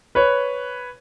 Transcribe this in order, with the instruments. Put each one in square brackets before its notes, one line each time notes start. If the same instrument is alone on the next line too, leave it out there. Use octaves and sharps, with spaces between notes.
[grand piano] B4 C#5